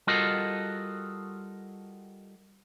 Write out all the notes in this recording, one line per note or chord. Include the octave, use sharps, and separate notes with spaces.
G3 F4 F#4 A4 A#4 D#5